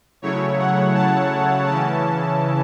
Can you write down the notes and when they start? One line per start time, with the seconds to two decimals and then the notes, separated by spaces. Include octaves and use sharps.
0.22 C#3 F#3 A3 E4 C#5
0.59 F#5
0.94 A5
1.67 C#3 E3 C#4 E4 A5